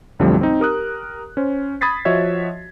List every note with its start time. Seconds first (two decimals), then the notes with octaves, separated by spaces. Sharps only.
0.19 B1 F2 D3 F3 G3 A3
0.41 C4 D#4
0.60 G4 A#4 D#6 F#6
1.37 C#4 C5
1.81 B5 D#6 G#6 A6 B6 C7
2.05 F3 F#4 C#5 D#5 E5 G#6